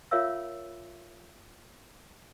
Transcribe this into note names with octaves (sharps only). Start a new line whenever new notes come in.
F4 A#4 C#5 E5 F5 E6